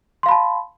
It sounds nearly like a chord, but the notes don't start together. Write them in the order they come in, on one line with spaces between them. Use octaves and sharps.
C6 F5 B5 A5